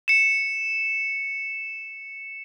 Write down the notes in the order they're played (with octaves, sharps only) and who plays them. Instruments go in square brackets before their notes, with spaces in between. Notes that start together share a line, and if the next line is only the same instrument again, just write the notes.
[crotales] C#7 E7